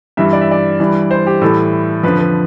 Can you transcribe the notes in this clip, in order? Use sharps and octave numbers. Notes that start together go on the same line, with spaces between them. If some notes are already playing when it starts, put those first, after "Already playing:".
G2 E3 G3 E5
D5
E5
D5
G2 E3 G3
C5
G4
A2 E3 G3 A4
F2 D3 F3 B4
B4